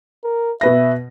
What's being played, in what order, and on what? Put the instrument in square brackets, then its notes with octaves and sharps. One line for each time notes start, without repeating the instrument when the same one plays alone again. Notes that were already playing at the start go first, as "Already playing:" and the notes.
[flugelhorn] A#4
[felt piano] B2 B4 A#6 [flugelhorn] E5